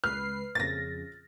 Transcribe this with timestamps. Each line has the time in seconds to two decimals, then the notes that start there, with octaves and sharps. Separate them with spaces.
0.04 C#2 B4 F6 C7
0.55 F2 C#3 A6 A#6